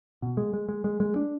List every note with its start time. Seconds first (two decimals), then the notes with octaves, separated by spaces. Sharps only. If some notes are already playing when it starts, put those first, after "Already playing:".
0.22 B2
0.37 G#3
0.53 G#3
0.69 G#3
0.84 G#3
1.00 G#3
1.16 D4